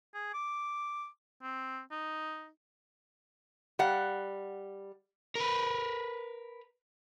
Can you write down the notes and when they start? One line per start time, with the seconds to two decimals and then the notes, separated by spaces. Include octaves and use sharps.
0.14 G#4
0.34 D6
1.42 C4
1.91 D#4
3.79 G3 F5 F#5
5.35 A#4 B4